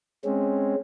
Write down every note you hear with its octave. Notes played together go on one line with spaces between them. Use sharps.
G#3 C4 C#4